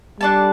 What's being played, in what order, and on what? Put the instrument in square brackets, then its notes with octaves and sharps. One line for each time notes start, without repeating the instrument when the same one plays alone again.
[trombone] G3 [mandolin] D4 A4 D5 A5